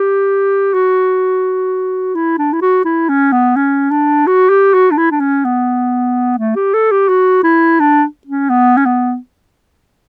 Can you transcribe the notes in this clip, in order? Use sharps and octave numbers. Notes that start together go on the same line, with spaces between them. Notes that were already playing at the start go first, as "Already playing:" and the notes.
Already playing: G4
F#4
E4
D4
E4
F#4
E4
C#4
B3
C#4
D4
F#4
G4
F#4
D4
E4
D4
C#4
B3
A3
G4
A4
G4
F#4
E4
D4
C#4
B3
C#4
B3